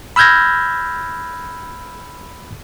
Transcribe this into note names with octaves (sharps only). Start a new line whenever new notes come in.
B5 E6 F6 G6 G#6 A#6